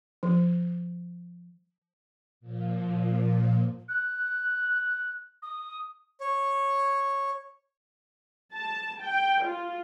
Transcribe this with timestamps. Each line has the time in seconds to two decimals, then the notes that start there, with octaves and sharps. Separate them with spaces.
0.23 F3
2.40 A#2 F3
3.88 F#6
5.42 D#6
6.20 C#5
8.54 A5
9.01 G5
9.43 F4